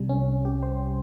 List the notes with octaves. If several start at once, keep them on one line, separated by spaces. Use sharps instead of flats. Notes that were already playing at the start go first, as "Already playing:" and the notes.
Already playing: C2 C3 G3
C#4
G4
C5